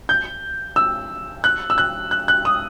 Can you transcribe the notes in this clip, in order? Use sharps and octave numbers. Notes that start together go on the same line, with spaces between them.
G6
E6
F#6
E6
F#6
F#6
F#6
D#6